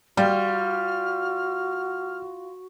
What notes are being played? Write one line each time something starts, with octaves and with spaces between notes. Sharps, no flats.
G3 F4 F#4 F6